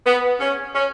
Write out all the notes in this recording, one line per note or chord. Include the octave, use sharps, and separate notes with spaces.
B3
C#4
C#4